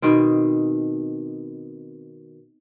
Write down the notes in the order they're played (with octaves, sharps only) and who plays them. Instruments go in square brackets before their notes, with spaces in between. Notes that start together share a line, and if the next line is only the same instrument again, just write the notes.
[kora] B2 D#3 C4